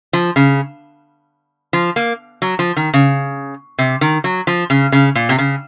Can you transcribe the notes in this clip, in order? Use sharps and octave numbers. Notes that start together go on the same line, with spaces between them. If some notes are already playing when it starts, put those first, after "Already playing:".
F3
C#3
F3
A#3
F#3
F3
D#3
C#3
C3
D#3
F#3
F3
C#3
C#3
A#2
C3
C#3